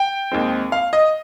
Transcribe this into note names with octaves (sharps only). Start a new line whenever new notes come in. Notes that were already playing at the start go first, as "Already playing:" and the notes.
Already playing: G5
D#2 D#3 G#3 C4
F5
D#5